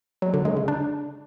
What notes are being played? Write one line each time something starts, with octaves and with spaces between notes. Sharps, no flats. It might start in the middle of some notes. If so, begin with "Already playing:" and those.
F#3
D3
G#3
C#3
D4